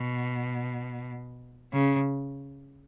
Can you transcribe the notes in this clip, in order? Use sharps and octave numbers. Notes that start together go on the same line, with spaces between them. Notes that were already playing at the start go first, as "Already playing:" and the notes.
Already playing: B2
C#3